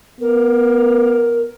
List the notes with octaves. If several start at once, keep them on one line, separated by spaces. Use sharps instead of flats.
B3 A#4